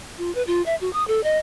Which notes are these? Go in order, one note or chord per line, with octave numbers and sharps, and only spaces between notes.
F4
B4
F4
E5
F#4
D#6
A4
D#5